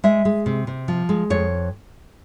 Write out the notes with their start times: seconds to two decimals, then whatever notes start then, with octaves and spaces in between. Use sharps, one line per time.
0.04 G#3 E5
0.25 G#3
0.46 C3
0.67 C3
0.88 F3
1.09 G#3
1.30 F2 C#5